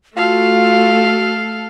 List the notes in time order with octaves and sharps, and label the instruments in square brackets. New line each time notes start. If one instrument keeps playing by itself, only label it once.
[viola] A3 [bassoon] F4 [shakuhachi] F#4 [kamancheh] A4 F5